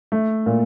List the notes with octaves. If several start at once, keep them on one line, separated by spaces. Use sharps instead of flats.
A3
A#2